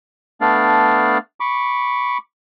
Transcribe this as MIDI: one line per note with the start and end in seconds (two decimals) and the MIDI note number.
0.41 1.18 57
0.41 1.18 59
0.41 1.18 62
0.41 1.18 74
0.41 1.18 77
1.40 2.18 83
1.40 2.18 85
1.40 2.18 86